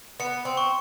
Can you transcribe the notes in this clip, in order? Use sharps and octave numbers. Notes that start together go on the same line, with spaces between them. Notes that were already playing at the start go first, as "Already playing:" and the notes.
B3 C#7
C4
C#6